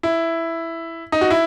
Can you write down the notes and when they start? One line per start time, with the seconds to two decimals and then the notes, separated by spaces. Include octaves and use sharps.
0.03 E4
1.12 D#4
1.21 F#4
1.31 E4